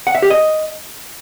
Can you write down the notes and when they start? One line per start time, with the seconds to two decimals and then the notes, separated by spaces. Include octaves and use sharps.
0.07 F#5
0.15 E5
0.22 G4
0.30 D#5